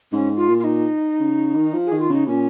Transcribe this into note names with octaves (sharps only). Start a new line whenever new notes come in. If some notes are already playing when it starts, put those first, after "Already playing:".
G#2 C#4
F4
A#2
F4
D#4
C#3
D#3
F3
G#4
D#3
F4
C#3 D#4
A#2 C#4